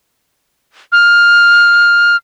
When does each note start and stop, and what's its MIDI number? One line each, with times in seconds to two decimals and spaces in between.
0.92 2.16 89